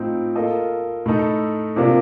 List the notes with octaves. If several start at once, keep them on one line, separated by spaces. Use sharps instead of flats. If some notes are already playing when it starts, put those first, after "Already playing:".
Already playing: A2 F3 C4 D#4
A#3 F4 A4 D#5
A2 A3 D#4 A4
C3 F3 A#3 D4 F4